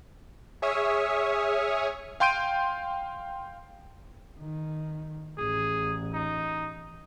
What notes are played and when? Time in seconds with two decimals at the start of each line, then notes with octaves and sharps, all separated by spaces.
0.62 G#4 C#5 E5 C#6 D#6 F6
2.20 F5 G5 C6 G6 D7 D#7
4.38 D#3
5.38 A1 G#4
6.13 D#4